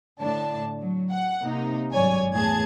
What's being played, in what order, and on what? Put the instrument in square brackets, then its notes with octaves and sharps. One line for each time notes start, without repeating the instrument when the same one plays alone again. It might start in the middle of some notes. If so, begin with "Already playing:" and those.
[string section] A2 D3 D4 A5
F#3
F#5
C3 A#3 D#4
G#1 G2 F#3 C#5 D5 G#5
E2 A2 G#4 A5 G#6